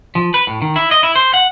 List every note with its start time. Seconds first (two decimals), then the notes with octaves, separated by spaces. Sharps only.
0.15 F3
0.34 B4
0.47 A2
0.62 D#3
0.76 E4
0.91 D#5
1.03 E4
1.16 C5
1.34 F#5